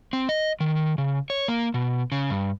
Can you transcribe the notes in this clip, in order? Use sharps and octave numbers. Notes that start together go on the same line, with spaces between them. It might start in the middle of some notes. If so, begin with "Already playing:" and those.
C4
D#5
D#3
C#3
C#5
A#3
B2
C#3
G2